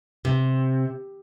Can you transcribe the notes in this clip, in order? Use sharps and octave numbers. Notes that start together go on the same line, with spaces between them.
C3